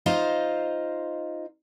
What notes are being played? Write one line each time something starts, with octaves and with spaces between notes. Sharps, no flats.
D#4 F4 C5 D#5 F5